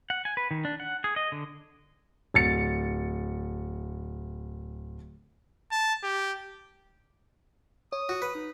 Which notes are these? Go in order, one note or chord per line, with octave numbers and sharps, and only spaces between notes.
F#5
G#5
B4
D#3
D4
F#5
G#4
D#5
D3
D1 A6 C#7
A5
G4
C#5 D#6
F#4
B4
D#4